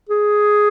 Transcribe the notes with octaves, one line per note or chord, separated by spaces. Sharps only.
G#4